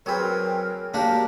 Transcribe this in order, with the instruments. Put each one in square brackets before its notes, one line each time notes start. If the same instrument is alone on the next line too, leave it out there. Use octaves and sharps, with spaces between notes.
[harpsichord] F#3 B4 [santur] C4 G#4 C#5 [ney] A#4
[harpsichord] A#3 F#4 G4 [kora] D4 A#4